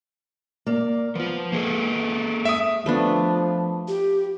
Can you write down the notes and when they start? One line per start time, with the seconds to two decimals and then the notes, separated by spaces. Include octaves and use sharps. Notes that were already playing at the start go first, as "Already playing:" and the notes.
0.66 A#3 D5
1.15 F3 B3 F4
1.52 A#3 G#4 A4
2.45 E5 D#6
2.86 F3 A3 B3 D4
3.88 G4